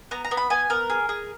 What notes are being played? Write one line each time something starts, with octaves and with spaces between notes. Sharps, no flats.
B3 A#5
A#5
B3
B5
B3 G#5
B3 A#4
G#4
G#4